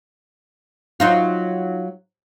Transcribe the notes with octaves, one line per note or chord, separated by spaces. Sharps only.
F#3 D#4 F4